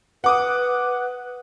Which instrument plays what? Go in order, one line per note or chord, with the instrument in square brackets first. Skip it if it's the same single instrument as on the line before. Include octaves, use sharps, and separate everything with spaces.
[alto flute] B4 [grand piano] F#5 D6 D#6